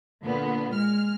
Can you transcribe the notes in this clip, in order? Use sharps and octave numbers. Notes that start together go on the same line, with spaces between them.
A#2 D3 B3
G#3 F6